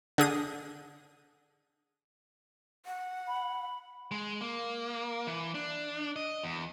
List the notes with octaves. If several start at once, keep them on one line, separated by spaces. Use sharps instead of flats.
D3 G#4 D#6
F#5
B5
G#3
A#3
E3
D4
D#5
E2